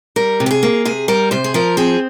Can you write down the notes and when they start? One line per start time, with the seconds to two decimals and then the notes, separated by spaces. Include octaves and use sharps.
0.16 G3 A#4
0.40 C3
0.46 G4
0.51 G#4
0.63 A#3
0.85 C3 G#4
1.08 G3 A#4
1.31 C3 C5
1.44 G#4
1.54 F3 A#4
1.77 C4 G#4